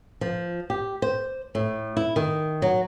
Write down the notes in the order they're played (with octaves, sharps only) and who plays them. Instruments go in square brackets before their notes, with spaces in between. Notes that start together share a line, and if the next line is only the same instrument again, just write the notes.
[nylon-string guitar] F3
G4
C5
A2
E4
D#3
F#3